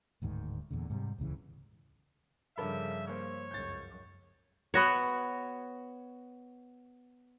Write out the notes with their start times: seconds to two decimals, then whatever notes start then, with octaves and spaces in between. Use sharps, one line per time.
0.22 D1 D2 G#2 D#3
0.71 E2 A#2 D3
0.90 G#2 C3 D#3 G3
1.18 D#1 C#2 C#3 E3
2.58 G2 C#3 F3 G3 D4 A4 A#4 E5
3.08 A#3 C5 C#5
3.51 C#2 F#2 G6 A6
4.74 B3 F#4 C#5